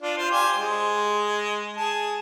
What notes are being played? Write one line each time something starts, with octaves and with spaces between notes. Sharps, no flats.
D4 F4
F4 C5
G4 C5 G#5
G#3
G#4 A5